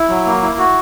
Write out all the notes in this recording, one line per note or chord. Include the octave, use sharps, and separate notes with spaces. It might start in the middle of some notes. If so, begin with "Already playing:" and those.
Already playing: E4
F#3
A#3
E4
F#4